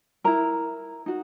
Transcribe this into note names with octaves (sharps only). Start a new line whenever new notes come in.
E4 A#4 A#5
D#4 F#4